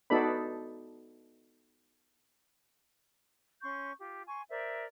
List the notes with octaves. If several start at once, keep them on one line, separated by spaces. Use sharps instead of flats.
B3 D#4 F#4 A4 D5 B5
C#4 C6 C#6 G6
F4 G4
G#5 C6 C#6
A#4 C5 D5 E5